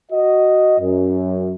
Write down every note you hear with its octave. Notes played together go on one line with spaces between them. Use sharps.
F#4 D#5
F#2